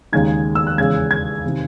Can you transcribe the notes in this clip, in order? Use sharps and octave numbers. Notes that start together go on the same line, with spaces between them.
D#2 C#3 G#3 D#4 G#6
E6
F#6
E2 C#3 G#3 G#6
G#6
C3 D#3